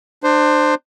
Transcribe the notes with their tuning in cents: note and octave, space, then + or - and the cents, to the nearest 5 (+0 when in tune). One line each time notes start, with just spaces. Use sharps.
D4 +30 C5 +0